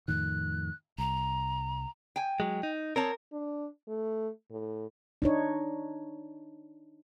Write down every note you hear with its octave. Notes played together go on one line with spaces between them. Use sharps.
F2 A2 D#3 F#6
C2 A#5
G5 G#5
F#3 G#3
D#4
C4 A#4 C#5 A5
D4
A3
A2
D4 D#4 C#5